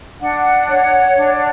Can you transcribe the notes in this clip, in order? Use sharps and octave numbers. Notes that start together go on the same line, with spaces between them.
D4 F#5
C#5
D4